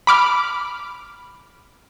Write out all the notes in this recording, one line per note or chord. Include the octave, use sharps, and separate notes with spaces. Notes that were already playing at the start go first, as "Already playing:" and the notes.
B5 D6 F6